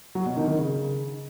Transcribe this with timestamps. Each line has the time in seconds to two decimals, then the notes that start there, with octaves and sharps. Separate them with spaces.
0.15 F#3
0.26 B2
0.37 D#3
0.48 D#3
0.59 C#3